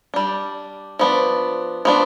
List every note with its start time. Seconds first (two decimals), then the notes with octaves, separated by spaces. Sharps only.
0.14 G3 D4
0.99 F3 B3 D4
1.85 F3 B3 D4